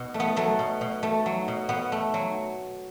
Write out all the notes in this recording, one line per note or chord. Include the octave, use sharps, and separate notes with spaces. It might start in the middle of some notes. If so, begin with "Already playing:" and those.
Already playing: B2
A3
B3
F#3 A3
B2
B2
A3
F#3
B2
B2 B3
A3
F#3